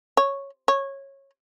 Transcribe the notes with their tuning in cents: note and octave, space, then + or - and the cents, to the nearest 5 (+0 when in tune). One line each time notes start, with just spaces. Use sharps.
C#5 -5
C#5 -15